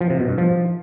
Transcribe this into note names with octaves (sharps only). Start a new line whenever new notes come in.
F3
C3
B2
G2
F3